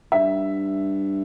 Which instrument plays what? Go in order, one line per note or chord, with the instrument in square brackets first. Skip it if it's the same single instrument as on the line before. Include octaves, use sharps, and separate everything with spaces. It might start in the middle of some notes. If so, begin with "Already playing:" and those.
[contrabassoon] G2 [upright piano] E5